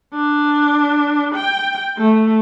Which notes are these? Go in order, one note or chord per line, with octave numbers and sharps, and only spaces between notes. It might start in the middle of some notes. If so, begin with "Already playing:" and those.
D4
G5
A3